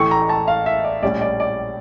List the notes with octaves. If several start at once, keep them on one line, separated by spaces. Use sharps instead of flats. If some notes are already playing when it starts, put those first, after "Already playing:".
Already playing: A1 A2 E3 A3 C#6
A#5
A5
F5
E5
D5
A#1 A2 G3 C#4 D5
D5
D5